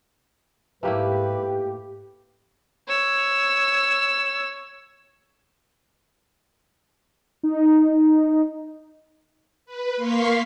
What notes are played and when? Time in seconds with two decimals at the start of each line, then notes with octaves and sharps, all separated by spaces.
0.83 G#2 A3 A#3 E4 G4 B4
2.88 C#5 E6
7.43 D#4
9.65 B4
9.96 A#3 F5 C6 C#6 B6 C7